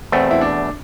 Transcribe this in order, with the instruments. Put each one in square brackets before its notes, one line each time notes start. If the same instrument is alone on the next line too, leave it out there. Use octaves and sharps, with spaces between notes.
[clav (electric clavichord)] E2 B2 A3 [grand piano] C4
[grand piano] E4
D4